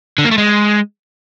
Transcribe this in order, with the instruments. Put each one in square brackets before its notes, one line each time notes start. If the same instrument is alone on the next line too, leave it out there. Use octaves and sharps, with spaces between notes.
[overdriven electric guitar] D3
A#3
A3
G#3